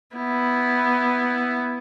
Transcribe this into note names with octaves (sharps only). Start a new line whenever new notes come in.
B3 E4